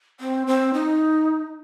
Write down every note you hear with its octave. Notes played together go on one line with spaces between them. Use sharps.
C4
C4
D#4